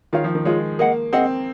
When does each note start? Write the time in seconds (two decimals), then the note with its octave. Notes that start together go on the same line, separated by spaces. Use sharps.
0.13 D#3 F4 G#4 C#5 F5
0.24 F3
0.35 D#3
0.45 G#3 F4 G#4 C#5 F5
0.79 A#3 G#4 D#5 F#5
1.12 C4 G#4 D#5 F#5